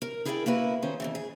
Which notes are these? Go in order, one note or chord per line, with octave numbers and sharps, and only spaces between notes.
A#4
E4 G#4 A#4 D5 F#5 G5
A#3 E4 F#4 B4
D#3 C#4 C5
F2 A#2 E3
G#4